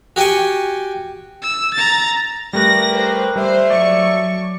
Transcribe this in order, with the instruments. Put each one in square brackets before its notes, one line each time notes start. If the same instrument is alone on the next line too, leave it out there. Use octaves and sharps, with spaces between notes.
[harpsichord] F#4 G4 G5 G#5 C#6
[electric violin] E6
A#5 A6
[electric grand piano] G3 A3 [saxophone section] G4 A#4 B4 [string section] A#6
[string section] C5
[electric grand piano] G3 [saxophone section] A3 E5 [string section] C5
[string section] F#3 C#6 [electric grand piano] D5